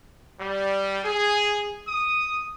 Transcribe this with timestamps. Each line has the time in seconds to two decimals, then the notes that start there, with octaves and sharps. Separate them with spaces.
0.40 G3
1.05 G#4
1.88 D#6